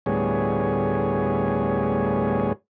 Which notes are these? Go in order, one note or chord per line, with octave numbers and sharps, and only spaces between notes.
D2 A2 G3 B3 G#4 C#5